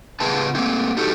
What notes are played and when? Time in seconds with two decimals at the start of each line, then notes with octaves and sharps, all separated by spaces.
0.20 C#3 B3 F4 G#4 B4 A5
0.55 A3 A#3 C4
0.97 D4 D#4 F#4 G4 A4